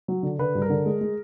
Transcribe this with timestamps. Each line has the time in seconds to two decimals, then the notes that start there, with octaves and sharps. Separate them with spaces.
0.08 F#3
0.23 D3
0.39 D3 B4
0.55 G2
0.62 A#4
0.70 D3
0.86 G#3
1.01 G#3